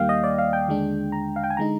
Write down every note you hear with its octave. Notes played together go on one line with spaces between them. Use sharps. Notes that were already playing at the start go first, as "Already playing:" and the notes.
Already playing: D#2 D#3 G3 A#3 F5 G5
D#5
D5
F5
G5
D#2 D3 G#3 D4
A#5
F5
G5
G#5
D3 G#3 D#4 A#5